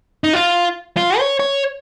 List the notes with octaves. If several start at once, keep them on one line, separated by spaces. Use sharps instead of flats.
D#4
F4
F4
C#5
C#5